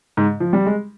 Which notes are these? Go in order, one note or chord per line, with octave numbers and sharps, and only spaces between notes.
G#2
F3
G3
G#3